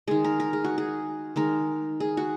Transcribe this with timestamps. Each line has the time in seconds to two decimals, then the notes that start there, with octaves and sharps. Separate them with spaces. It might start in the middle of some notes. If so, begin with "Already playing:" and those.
0.07 D#3 G#3 G#4
0.24 A#4
0.40 A#4
0.53 G#4
0.64 F#4
0.78 G#4
1.36 D#3 G#3 A#4
2.00 G#4
2.17 F#4